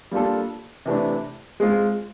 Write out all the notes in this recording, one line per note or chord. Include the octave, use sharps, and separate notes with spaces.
G3 A#3 D4 F4 A4
C3 E3 A3 D4
G#3 C4 F4